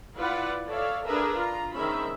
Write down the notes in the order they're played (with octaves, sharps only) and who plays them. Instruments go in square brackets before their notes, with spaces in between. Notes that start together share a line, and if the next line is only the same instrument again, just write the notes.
[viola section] E4 F4 B4 D5 F#5
A4 C#5 D5 E5 F5
D4 G#4 A#4 B4 E5
F4 A#5
D#3 G#3 C4 C#4 E5 B5